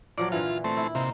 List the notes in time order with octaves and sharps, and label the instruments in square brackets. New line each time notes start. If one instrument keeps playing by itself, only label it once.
[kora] A#2 F3 F#3 [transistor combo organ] D5
[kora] A#2 D3 E3 [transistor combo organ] F4
[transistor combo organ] A3 C4
[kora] E4
[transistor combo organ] C3 [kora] A#3 D#4